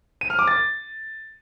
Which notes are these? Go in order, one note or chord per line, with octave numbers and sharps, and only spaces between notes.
D#7
F6
D6
A6